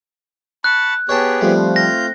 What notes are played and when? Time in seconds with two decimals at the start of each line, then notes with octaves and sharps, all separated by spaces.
0.64 A5 B5 C#6 F#6
1.09 B3 G4 G#4 C#5 G5 A5
1.41 F3 G3 A3 C4
1.76 F4 G6 A#6